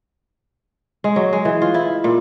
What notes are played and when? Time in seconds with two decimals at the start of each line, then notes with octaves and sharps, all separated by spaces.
1.04 G#3
1.16 F#3
1.33 G#3
1.45 E3
1.62 F4
1.74 E4
2.04 A#2